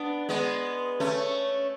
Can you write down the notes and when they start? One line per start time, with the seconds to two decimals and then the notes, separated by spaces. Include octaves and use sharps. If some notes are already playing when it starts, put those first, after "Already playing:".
Already playing: B3 D4
0.29 G#3 B3
1.00 A3 C#4